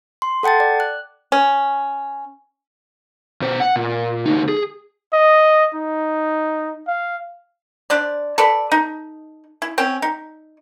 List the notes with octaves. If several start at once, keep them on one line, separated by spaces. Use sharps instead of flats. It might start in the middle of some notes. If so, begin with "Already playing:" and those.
C6
A4 F#5 G5 A5 A6
D5
F#6
C#4
B2 C5
F#5
A#2
D2 D#4
G#4
D#5
D#4
F5
D4 C5 D5
A4 B4 D5
D#4
E4
C4 C#4 G5
D#4